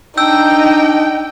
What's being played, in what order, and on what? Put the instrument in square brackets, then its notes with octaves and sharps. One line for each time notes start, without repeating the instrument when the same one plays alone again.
[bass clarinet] D4 [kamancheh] D#4 [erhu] G5 [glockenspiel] E6 G6